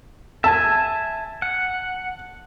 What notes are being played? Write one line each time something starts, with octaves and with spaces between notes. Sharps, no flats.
E5 G#5 A5
F#5